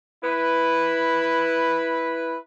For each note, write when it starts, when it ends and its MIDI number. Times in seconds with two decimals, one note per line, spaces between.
0.24 2.37 64
0.24 2.37 71